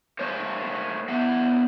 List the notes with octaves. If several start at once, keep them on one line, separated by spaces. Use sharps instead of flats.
A3 A#3 C5 C#5
B3 D4 E5 F#5